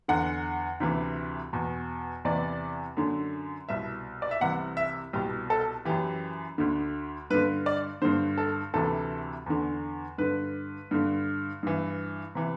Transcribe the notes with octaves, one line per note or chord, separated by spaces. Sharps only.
E2 D3 F#5
D2 C3 E3
E2 B2
E2 C3 E3 D5
F#2 D3
C2 B2 E5
D5
E5
C2 C3 E3 F#5
E5
C2 B2 G4
A4
F#2 E3 G4
D2 D3
G2 D3 B4
D5
G2 D3 C5
A4
D2 C3 E3 A4
E2 D3
G2 D3 B4
G2 D3
G2 E3
C3 E3